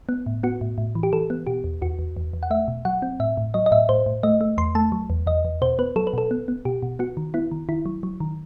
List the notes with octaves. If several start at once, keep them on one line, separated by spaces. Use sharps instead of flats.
B3
A2
B3 F#4
A2
A2
E3
G4
E3 A4
B3
B2 G4
E2
E2 F#4
E2
E2
E2
F#5
A3 E5
B2
F#3 F#5
C4
A2 E5
A2
F#3 D#5
D#5
A2 E5
A2 C5
A2
A3 D#5
A3
E2 C6
A3 A5
F#3
E2
E2 D#5
E2
B2 C5
B3 B4
F#3 A4
B4
B2 A4
B3
B3
B2 G4
B2
B3 F#4
D#3
B3 E4
D#3
D#3 E4
F#3
F#3
D#3